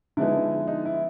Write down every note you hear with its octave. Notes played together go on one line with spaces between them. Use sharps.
D3 F3 G#3 B3 D#4 E4
D#4
E4